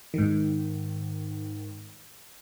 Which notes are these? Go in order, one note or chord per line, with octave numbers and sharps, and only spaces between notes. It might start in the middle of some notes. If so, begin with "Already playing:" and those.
G#2 D#3